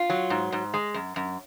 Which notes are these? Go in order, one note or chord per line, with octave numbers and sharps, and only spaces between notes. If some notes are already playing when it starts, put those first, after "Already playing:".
Already playing: F4
F#3
G#2
G#2
G#3
F#2
F#2